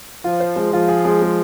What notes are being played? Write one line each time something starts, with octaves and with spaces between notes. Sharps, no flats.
F3 F4
C5
G#3
F3 F4
G#4
G#3
G#3